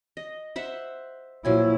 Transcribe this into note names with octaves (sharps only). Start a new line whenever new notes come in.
D#5
C5 E5 F#5
A#2 F3 F#3 E4 G#5